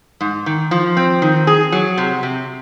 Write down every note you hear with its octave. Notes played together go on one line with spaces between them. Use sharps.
G#2
D#3
F3
C4
D#3
G#4
F#3
C3
C3